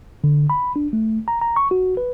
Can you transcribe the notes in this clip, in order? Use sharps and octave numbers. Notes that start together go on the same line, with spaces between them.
D3
B5
D4
A3
A#5
A#5
C#6
F#4
B4